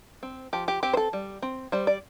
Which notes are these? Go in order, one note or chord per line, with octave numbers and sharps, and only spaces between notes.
C4
F3 G4
G4
C4 G4
C5
A4
G3
C4
G3 C5
D5